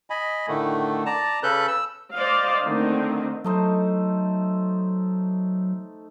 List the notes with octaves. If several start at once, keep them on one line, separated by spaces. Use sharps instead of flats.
D#5 G#5 B5
A2 D3 D#3 A3
D5 A5 A#5
C#3 C#4 A4 B4 F#6 G6
E6
C5 D5 D#5 F5
D3 D#3 A3 A#3 C4 D#4
F#3 A3 D#4 C5